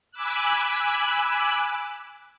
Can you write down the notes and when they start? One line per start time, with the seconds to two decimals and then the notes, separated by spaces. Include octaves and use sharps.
0.11 G#5 B5 D6 E6 F#6